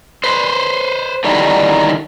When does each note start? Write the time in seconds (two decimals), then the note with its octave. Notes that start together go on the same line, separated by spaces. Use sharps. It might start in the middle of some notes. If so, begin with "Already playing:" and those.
0.24 B4 C5
1.24 D3 D#3 F#3 G3 D#4 E4